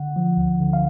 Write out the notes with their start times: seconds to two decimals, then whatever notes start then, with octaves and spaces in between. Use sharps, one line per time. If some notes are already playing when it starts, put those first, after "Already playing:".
Already playing: D3 F#5
0.16 F3
0.37 D2
0.60 D3
0.73 F5